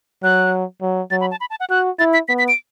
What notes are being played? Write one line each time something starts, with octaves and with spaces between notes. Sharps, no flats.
F#3 F#6
F#3
F#3 A6
B5
A5
B5
A5
F#5
F#4 F#6
E4 A6
B6
B3 B6
B6
D7